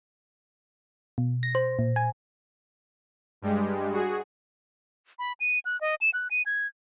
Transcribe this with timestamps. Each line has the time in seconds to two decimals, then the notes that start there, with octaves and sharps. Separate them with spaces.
1.18 B2
1.43 A#6
1.55 C5
1.79 A#2
1.96 G#5
3.42 G2 G3 G#3
3.93 F#4 G#4
5.19 B5
5.40 D#7
5.65 F#6
5.81 D#5
6.01 E7
6.14 F#6
6.31 D#7
6.46 G#6